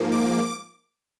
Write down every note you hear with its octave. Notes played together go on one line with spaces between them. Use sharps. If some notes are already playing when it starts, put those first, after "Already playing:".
Already playing: G#2 F3 A#3
D6